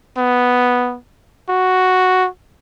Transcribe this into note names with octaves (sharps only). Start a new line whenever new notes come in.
B3
F#4